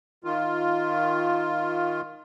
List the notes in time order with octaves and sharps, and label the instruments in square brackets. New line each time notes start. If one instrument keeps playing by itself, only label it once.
[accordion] D#3 F4